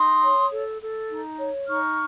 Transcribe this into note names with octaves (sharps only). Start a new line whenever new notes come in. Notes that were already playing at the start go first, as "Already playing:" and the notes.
Already playing: D#4 C6 D#6
C#5
A4
A4
D#4
C#5
D#4 C#6 F6